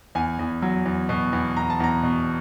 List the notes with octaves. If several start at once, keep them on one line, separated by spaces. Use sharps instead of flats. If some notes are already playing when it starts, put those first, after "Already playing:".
E2 G#5
E2
F#3
E2
B2
E2
E2 A#5
A5
E2 A#5
B2